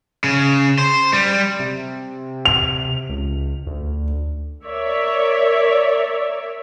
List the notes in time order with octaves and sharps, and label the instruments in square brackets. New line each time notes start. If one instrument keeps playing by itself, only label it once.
[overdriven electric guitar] C#3
C5
G3
[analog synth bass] C3
[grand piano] F7
[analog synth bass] C#2
D2
[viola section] A#4 C#5 D5 E5